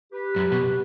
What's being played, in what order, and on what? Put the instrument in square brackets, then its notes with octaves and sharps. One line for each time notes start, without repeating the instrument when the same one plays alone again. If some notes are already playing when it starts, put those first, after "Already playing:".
[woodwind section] G4 B4
[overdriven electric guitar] F#2
B2